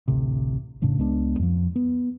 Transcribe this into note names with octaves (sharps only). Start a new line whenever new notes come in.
A1 D2 C3
F1 A2 C#3 D4
C#2 G#3 B3 D4
F2 F3
B3